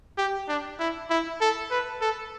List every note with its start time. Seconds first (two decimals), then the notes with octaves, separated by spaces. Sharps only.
0.18 G4
0.48 D4
0.80 E4
1.10 E4
1.41 A4
1.71 B4
2.01 A4